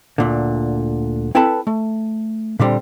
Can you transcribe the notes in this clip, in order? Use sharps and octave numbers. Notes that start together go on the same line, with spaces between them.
D2 A#2 D3
C4 E4 A4 B4 A5 B5
A3
A#2 D3 G3 C4